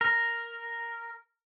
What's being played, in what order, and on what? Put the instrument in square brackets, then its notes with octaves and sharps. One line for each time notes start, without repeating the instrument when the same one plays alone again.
[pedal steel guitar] A#4